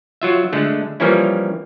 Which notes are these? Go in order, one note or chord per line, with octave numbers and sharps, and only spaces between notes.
F#3 F4 E5
D3 G#3 A3
E3 F3 G3 A#3 C#4 E4